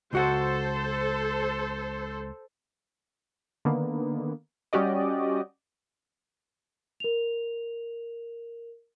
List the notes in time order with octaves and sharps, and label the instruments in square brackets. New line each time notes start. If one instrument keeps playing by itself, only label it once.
[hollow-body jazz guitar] C#2 F#4 F#5 [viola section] A4 C5
[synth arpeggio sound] D3 D#3 A#3 B3
G3 C#4 F#4 G4 D5 D#5
[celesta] A#4 F7